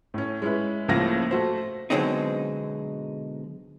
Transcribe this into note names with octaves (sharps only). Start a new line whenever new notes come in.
A2 C#4
G#3 C#4 E4 B4
C#2 A2 F3 A#3 F5 A#6
A3 F#4 C5
B2 D3 F#3 G#3 C4 D#4